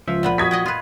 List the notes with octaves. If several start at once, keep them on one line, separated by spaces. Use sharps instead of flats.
C#2 F3 E5
A#2 B3 B4
F#4 D#6 G#6 B6
D#5 F#5 G5
F4 B4